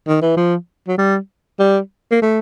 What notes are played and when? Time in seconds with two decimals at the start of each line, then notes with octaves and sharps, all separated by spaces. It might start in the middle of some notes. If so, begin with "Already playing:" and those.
0.08 D#3
0.22 E3
0.36 F3
0.88 F#3
0.98 G3
1.59 G3
2.11 A#3
2.22 A3